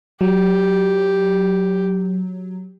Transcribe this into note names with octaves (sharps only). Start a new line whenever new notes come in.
F#3 G4